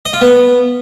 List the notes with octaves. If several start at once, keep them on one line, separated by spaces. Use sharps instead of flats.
D#5
F4
B3